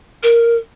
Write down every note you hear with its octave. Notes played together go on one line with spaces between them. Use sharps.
A#4